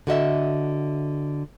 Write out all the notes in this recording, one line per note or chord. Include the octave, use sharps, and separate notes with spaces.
D3 F#4 D#5 E5